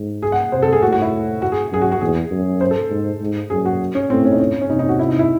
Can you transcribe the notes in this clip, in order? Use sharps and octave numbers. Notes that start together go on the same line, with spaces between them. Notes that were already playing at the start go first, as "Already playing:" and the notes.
Already playing: G#2
G#4
F#5
C3 C5
A4
G#4
A2 F#4
F#4
E4
F#4
G#4
F#2 G#4
F#4
F#4
E2 G#4
F#2
C5
A4
G#2
G#2
F#2 G#4
F#4
C#4
A2 C4
C#4
D#4
C#4
C#4
C3 D#4
D#4
F#4
E4
D#4
E4